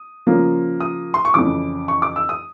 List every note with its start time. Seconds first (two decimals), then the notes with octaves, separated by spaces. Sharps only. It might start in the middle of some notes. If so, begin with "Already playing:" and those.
Already playing: D#6
0.27 C#3 F3 A#3
0.80 D#6
1.14 C6
1.25 C#6
1.34 F2 C#3 E3 D6
1.88 C#6
2.02 D6
2.16 E6
2.29 D#6